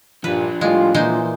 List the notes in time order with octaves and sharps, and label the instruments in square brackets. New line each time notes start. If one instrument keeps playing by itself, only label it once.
[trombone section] G2 A#2 [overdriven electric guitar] F3 D4 [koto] B4
[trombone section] A2 G3 F4 [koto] G#3
[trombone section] A#2 E3 [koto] G#3 D#4 C5